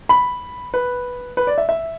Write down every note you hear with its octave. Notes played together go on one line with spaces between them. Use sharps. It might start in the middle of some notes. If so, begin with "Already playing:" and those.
B5
B4
B4
D5
E5
E5